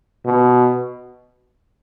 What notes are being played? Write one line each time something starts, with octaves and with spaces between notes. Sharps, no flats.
B2